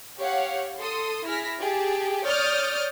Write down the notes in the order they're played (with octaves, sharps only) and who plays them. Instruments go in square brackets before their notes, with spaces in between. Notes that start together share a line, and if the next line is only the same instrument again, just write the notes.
[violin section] G4 C#5 F5 F#5
A4 C6 D#6
E4 G#4 F6 A#6 B6
G4 G#4 A5
C#5 D5 D#6 F6 G6 A6